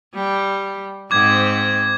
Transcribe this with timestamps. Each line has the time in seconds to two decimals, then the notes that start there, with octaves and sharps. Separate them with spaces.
0.15 G3
1.11 G#2 C4 D6 G#6